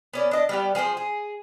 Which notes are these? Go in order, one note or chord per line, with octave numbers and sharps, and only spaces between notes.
B3 C#4 D5
D4 D#5
G3 B3 G4
F3 G#4 B4 C5
G#4